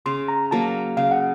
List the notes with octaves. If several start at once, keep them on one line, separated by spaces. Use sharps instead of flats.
C#3 C6
A#5
F#3 A#3 A5
C#3 F5
F#5